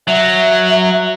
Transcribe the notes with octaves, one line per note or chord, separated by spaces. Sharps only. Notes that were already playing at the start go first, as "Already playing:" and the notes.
F#3 E5